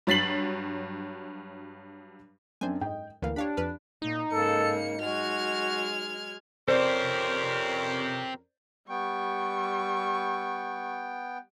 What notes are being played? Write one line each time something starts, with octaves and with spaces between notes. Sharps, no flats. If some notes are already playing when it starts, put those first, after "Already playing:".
G2 F#3 A6 B6 C7 F#7
F#2 C4 D4 C5 G#5
G#2 D#5 G5
D2 E3 A#3 F5
D4 G4 C#5 F5 B5
F2 B4 F5
A#2 D#4
G#2 C#3 A#3 A4 C#7
F#3 G#3 F#4 F6 G#6
F2 C4 C#4 G4 A#4 C5 D5
G3 B3 G5 C#6